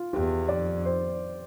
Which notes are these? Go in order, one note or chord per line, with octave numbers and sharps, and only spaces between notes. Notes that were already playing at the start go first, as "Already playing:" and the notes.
Already playing: F4
E2 G4
F2 D5
C5